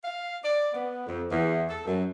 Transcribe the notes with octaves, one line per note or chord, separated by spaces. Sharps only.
F5
D5
B3
F2
E2
A4
F#2